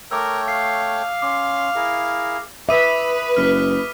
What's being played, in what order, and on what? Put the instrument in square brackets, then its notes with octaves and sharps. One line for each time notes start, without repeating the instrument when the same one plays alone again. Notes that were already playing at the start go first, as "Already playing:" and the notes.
[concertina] A3 C#5 G5 [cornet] A#4 [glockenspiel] D6 E6
[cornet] F5 [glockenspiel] C7
[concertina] C#4 C6 [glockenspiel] D6
[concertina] E4 G#4 A#4
[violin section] B4 [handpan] E5 [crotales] D6 D#6 D#7
[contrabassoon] F#1 [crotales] F6 B6